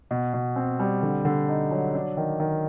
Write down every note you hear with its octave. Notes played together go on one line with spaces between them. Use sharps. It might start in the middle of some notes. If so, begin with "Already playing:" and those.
B2
B2
C4
G3
D3
D3
D#4
F#3
D4
D#3
D#3